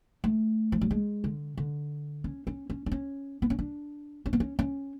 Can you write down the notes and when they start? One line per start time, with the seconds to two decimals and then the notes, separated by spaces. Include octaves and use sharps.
0.24 A3
0.72 F3
0.82 F#3
0.91 G#3
1.24 D3
1.57 D3
2.24 C#4
2.47 C#4
2.70 C#4
2.86 D4
2.92 C#4
3.42 B3
3.50 C#4
3.59 D4
4.26 C#4
4.33 B3
4.40 C#4
4.59 C#4